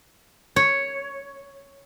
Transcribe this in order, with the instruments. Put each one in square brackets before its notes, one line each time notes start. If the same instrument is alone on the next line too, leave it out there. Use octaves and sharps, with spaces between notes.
[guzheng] C#5